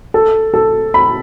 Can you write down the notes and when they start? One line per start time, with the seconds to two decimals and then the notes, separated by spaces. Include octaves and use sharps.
0.14 A4
0.54 A4
0.94 B5